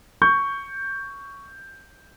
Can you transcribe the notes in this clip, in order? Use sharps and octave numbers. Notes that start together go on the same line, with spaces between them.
C#6 G6